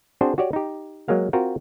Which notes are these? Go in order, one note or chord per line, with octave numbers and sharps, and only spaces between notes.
C4 D4 F#4 G#4 C5
F#4 G4 C#5 D5
D#4 G4
F#3 G#3 A#3 F5
C4 F4 F#4 A#4